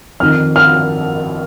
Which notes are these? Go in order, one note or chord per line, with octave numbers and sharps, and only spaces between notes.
F2 D#3 F6
F6